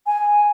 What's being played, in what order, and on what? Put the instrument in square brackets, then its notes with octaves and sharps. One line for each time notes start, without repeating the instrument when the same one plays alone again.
[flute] G#5